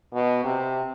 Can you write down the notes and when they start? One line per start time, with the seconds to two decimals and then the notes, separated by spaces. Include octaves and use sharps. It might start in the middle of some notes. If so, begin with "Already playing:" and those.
0.13 B2
0.44 C3